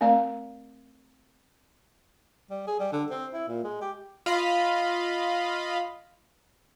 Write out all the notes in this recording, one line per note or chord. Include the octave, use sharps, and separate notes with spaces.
A3 C4 A#4 D5 F5 A#5
G3
G#4
G3
D3
C4
E4
A#2
G#3
G4
F4 D#5 F5 B5